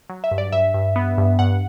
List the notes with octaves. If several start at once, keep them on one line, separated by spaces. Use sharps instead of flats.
F#3
E5
G2
D5
G2 E5
G2
B3
G2
G2 F#5